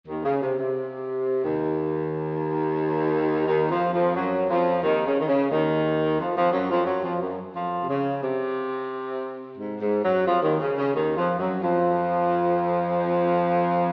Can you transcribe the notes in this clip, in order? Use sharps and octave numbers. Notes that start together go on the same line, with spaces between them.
D#2 D#3
C#3
C3
C3
D#2 D#3
D#2 D#3
F2 F3
F2 F3
F#2 F#3
F2 F3
D#2 D#3
C#3
D#3
C#3
D#2 D#3
F2 F3
F2 F3
F#2 F#3
F2 F3
F#2 F#3
F2 F3
F#2
F2 F3
C3
C#3
C3
G#2
G#2
F#2 F#3
F2 F3
D#2 D#3
C#3
C#3
D#2 D#3
F2 F3
F#2 F#3
F2 F3